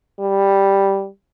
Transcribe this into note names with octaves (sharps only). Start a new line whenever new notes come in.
G3